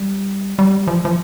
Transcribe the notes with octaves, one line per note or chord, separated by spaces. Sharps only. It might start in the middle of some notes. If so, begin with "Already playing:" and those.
Already playing: G3
G3
F3
F3